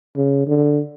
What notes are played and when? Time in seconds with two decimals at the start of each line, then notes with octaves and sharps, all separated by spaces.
0.16 C#3
0.47 D3